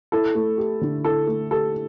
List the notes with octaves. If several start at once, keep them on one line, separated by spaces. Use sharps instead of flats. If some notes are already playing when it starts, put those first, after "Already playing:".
E4 A4
A3
G4
D3
E4 A4
A3
G4 A4